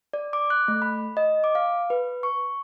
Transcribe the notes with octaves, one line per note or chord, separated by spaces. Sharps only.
D5
D6
F#6
A3
B5
D#5
D6
F5
B4
C#6